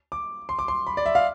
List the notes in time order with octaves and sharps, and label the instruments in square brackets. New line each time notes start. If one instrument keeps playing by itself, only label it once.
[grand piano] D6
C6
D6
C6
B5
D5
E5
F5